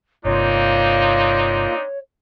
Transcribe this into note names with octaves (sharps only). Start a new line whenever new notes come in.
G1 C3 A#3 C4 D4 D#4 F4 C#5